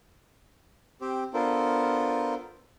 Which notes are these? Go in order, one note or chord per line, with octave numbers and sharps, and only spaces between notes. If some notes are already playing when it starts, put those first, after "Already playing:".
C4 G4 C5
B3 D4 F4 A4 A#4 C5